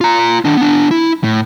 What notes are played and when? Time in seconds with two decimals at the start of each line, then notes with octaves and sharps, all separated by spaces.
0.01 F4 A#5
0.45 D#3 D4
0.57 B3 D4
0.91 E4
1.24 A2